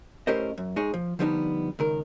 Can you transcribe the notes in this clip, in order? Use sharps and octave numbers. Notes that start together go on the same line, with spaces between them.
A2 C#4 G4 A#4 C5 D#5
F#2
G#3 D#4 G#4 C#5
F3
D3 F3 G3 B3 C#4 D#4
C#2 D#3 A#4